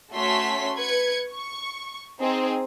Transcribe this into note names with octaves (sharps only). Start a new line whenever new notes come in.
A3 C#4 F#4 C#5 C6 B6
B4 G#6 C#7
C#6
C4 D#4 G#4